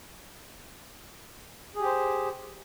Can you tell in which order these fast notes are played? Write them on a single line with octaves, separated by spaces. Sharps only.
G#4 G4 C5